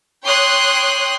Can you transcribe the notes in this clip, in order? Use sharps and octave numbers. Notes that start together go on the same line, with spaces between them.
C#5 G5 C6 D#6 F#6